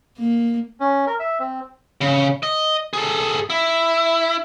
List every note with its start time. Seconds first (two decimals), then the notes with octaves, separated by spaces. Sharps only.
0.18 A#3
0.80 C#4
1.07 A#4
1.19 E5
1.40 C4
2.01 C#3
2.43 D#5
2.93 G#4 A4
3.50 E4